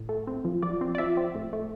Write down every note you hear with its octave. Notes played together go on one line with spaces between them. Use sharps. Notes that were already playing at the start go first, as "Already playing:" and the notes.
Already playing: A2
A3
C4
F3
F3 D5
C4
D5
F3 E5
C4
A2
A3